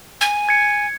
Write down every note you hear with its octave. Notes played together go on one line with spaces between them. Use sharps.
G#5
G#6 C#7